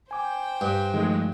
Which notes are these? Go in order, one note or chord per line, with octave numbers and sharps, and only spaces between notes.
C5 G5 G#5 D6
G2
D#3 F3 G#3 A3